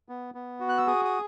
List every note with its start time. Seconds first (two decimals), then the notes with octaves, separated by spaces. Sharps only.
0.09 B3
0.34 B3
0.60 F#4
0.69 F#6
0.78 E6
0.87 G#4 D#6
1.05 D#6